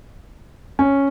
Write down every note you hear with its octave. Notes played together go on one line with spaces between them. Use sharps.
C#4